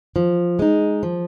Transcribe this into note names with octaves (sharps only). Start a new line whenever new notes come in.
F3
G#3 D#4
F3